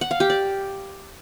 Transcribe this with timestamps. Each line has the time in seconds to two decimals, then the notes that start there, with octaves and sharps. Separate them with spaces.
0.01 F#5
0.11 F5
0.20 G4
0.30 D5